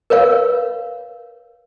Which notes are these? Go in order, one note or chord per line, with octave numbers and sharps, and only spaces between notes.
A#4 B4 C#5 F5